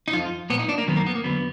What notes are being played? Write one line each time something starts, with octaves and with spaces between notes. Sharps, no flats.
D#4
F2 F3 F4
A#2 F3 B3
D#4
D4
A#3
F#2 D#3 F#3 B3
A#3
B3
A#3
F2 D3 F#3 B3